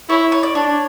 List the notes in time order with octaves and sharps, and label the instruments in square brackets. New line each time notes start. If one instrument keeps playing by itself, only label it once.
[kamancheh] E4 [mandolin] C#5
[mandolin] C#5
D5
[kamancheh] D4 [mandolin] C#5